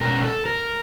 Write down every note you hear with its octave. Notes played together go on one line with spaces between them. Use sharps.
B2 G#3 C#4 A#4
A4
A#4